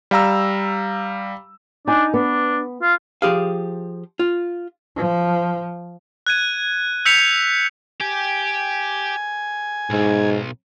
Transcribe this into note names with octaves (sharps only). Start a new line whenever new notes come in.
G3 F5 A#5 E6
D4 D#4 G#5
B3 D4
F4
F3 G4 G#4 F5
F4
F3
F#6 G#6 D#7
E6 G6 B6 C#7 F7
G4 G#5
B1 G#2